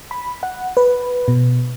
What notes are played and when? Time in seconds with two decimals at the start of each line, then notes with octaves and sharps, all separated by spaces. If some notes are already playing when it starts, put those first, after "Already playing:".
0.11 B5
0.43 F#5
0.77 B4
1.28 B2